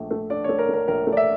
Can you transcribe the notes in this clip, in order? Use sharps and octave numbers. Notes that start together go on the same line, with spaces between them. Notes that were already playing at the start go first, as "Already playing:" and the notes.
Already playing: A#1 A3
A3
D4 D5
A3 C#5
A#4
A3 A#4
A#1 A#4
A3
D5
E5